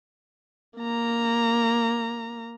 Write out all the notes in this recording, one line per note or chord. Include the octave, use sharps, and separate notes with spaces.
A#3 A#5